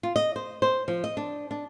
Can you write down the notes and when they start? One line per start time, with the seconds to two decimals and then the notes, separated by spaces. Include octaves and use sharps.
0.03 F4
0.16 D#5
0.36 C5
0.62 C5
0.88 F3
1.04 D#5
1.17 D4
1.51 D4